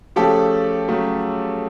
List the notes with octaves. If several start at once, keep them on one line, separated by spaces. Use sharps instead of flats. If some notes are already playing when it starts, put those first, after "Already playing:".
C#3 F3 A3 G4 A4
C#3 F#3 A3